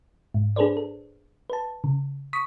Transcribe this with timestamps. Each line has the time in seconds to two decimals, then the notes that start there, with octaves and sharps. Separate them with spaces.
0.34 G#2
0.56 D4 G#4 A4 B4 C5 D5
0.77 A4
1.50 B4 A5
1.84 C#3
2.33 C#6 D#6 B6